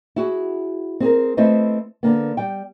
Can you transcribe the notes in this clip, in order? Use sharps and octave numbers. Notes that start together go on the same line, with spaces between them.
E4 F#4 G#4
C4 G#4 A#4
A3 C4 E4 B4 C5 D#5
D3 A#3 B3
G3 G5